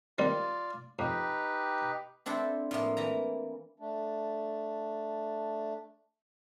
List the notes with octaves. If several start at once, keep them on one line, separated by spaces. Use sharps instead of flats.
D#3 G3 C4 F4 D5
F2 D#4 G4 B4
C4 D4 E4 A4 C5
A2 F3 A#3
E3 A#3 A#5
A3 D4